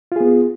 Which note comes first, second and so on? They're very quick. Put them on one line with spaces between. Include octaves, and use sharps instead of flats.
F4 G#4 B3